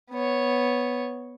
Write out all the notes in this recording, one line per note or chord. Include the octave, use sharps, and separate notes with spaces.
B3 C#5